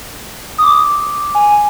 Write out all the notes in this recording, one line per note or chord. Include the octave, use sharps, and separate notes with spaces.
D#6
D6
G#5